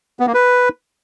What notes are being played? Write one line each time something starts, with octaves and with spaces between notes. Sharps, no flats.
B3
A#3
B4